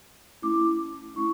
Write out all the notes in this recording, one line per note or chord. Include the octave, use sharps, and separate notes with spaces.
A3 C#4 E4 D6
A3 C#4 E4 C#6